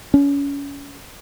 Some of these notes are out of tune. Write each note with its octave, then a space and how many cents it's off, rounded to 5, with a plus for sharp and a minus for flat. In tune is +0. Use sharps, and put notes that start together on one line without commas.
C#4 +30